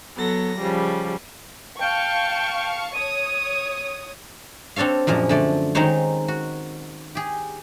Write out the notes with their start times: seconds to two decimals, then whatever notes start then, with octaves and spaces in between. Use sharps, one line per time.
0.16 F#3 B3 A4 A#6
0.59 C#3 F3 G3
1.79 F5 G5 A5 C#6
2.94 C#5 D#6 D#7
4.76 C4 D4 A4 C#5 F5
5.07 F#2 A#2 F3 G#3 A#5
5.29 D3 A3 D5
5.75 D#3 G#3 C4 D#4 C5 C#5
6.28 F#4
7.15 G4 G#4